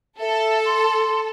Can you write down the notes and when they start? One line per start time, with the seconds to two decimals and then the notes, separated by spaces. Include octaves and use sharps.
0.20 A4 E5
0.65 C6